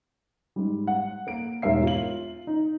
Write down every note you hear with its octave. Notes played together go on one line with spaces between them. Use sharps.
G#2 G3
F#5
A#3 D7
E1 G#2 G4 A#4 E5 C7
F4 F#7
D#4